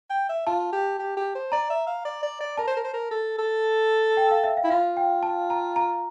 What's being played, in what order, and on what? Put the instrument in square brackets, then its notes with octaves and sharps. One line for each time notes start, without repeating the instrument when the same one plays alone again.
[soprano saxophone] G5
E5
[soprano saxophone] F4 [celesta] A5
[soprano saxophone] G4
G4
G4
C5
[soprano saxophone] D5 [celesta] A#5
[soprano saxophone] E5
F5
D5
D5
D5
[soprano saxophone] A#4 [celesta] A5
[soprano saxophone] C5
A#4
C5
A#4
A4
A4
[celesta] G5
F5
E5
F5
[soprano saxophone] E4
[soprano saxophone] F4 [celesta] F5
[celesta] G5
A5
A#5
A#5